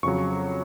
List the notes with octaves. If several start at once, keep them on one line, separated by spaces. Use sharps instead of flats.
F2 C#3 F#3 C#6